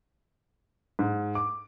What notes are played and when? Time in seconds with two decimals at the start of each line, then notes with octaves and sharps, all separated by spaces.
0.99 G#2
1.35 D6